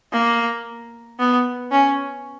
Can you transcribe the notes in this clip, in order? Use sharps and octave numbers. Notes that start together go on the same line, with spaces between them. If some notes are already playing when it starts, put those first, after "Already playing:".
A#3
B3
C#4